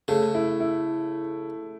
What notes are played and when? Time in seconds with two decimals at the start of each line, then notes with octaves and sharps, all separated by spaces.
0.08 C#3 A3
0.35 E4
0.60 E4